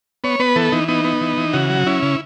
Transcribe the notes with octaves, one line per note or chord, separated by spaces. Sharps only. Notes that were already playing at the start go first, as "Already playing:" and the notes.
B3 C#5
B3 B4
E3 A4
E3 D#4
B3 D#4
B3
E3
E3
C#3 F#4
F#3
C#4 E4
C#3